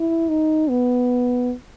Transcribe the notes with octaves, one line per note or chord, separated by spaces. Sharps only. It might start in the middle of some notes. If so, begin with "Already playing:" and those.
Already playing: E4
D#4
B3